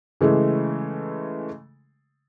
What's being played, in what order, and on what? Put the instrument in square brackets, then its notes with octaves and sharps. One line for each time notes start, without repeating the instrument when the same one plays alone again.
[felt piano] C#3 E3 G#3 A3